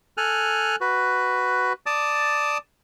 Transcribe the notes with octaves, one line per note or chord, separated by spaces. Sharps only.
A4 G#5 F6 F#6
F#4 B4
D5 A5 D6 D#6